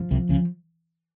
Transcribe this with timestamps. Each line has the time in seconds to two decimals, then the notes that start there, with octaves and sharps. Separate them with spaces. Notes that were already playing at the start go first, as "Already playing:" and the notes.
Already playing: F3
0.11 C2 C3
0.29 C#2 C#3